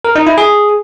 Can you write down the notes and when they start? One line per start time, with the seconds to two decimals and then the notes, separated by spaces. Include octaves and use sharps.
0.05 A#4
0.16 D#4
0.27 E4
0.38 G#4